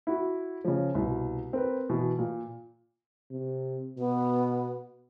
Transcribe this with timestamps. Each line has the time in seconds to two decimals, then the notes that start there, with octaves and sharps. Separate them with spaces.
0.07 E4 F#4
0.64 C#3 F3
0.95 C2 B2
1.53 C4 A#4 B4
1.89 B2 E3
2.19 A#2
3.31 C3
3.98 B2 B3